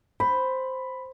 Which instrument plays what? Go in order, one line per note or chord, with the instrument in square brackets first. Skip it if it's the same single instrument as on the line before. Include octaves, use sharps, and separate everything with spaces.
[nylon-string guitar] C5 [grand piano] B5